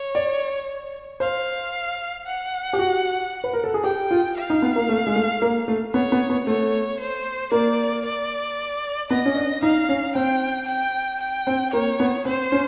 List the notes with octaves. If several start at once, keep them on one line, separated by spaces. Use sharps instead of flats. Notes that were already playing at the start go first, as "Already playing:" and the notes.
Already playing: C#5
D5
C5 F5
F#5
G4
F#4
B4
A#4
A4
G#4
G4 G5
F4
F5
D#4
B3
A#3
A3
G#3
A3
A#3
A3
B3 C#5
B3
B3
A3 C#5
C5
A#3 D5
D5
B3 D#5
C#4
D4
D#4 F5
C#4
C4 G5
G5
G5
C4
A#3 C#5
B3
C4 C5
C#4